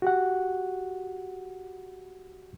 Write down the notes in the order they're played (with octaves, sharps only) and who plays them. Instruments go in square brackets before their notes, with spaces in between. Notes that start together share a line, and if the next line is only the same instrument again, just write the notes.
[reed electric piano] F#4 G4 F#5